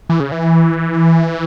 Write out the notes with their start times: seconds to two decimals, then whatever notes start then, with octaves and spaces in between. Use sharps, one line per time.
0.09 E3
0.20 C#3
0.32 E3